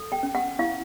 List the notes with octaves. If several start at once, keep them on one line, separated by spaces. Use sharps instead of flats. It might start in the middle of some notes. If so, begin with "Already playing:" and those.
Already playing: A4
G5
C#4
F#5
E4 F5